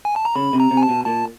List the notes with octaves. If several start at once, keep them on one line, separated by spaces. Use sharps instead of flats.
G#5
A5
A#5
C#3 B5
C3
A#5
C3
G#5
A5
B2
A#2 A5